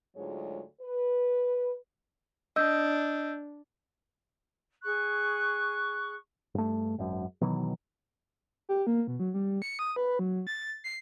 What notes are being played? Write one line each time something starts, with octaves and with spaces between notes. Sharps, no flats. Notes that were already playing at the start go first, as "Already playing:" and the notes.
D2 G#2 F#3 G#3 F4 C#5
B4
D4 D#5 E6 G6
G#4 C#6 F#6
G2 A3
G#1 F#2
B2 D#3 E3 F#3
G4
A#3
B2
F#3
G3
C#7
D#6
B4
F#3
A6
C7